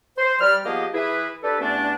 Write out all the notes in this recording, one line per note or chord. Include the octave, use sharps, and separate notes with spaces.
C5
G3 F6
F3 A#3 B3 G4 G#4 D#5
E3 E4 G#4 B4
D4 G4 A4 B4
E2 G2 A3 B3 C#4 D4